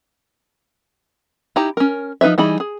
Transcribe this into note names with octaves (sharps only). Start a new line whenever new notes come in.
D#4 E4 G4 A#5
C#4 A#4
F3 D#4 B4 C#5 E5
E3 G3 D#4 G#4 B5
G#4